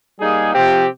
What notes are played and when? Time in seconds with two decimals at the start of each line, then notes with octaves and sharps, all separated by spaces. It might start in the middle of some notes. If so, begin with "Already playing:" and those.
0.19 G3 A#3 D#4 G#4
0.52 C3 F3 C4 G4